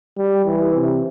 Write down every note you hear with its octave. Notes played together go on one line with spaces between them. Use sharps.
G3
E3
C3